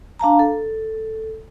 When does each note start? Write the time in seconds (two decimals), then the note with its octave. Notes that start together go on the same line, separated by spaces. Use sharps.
0.20 D4 F5 A5 A#5
0.39 A4